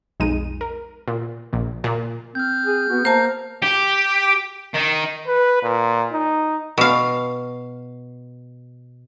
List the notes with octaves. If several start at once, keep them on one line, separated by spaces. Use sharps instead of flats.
B1 F2 G#3 D#4 D#7
A#4
A#2
A#1
A#2
C4 F6 G6
G#4
B3 F#4
A#3 C5 A5 A#5
G4
D#3
B4
A#2
D#4
B2 F5